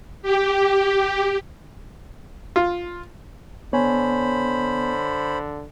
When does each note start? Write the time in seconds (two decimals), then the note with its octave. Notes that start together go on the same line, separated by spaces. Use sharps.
0.22 G4
2.56 F4
3.73 D3 B3 C5 C#5 G#5 B5